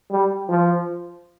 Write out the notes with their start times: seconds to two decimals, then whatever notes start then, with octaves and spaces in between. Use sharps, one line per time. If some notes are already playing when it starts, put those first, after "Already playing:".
0.11 G3
0.49 F3